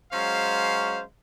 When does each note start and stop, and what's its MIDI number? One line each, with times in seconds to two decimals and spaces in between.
0.13 1.03 54
0.13 1.03 56
0.13 1.03 61
0.13 1.03 72
0.13 1.03 77